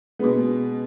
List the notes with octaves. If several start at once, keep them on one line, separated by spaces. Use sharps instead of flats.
B2 G#3 B3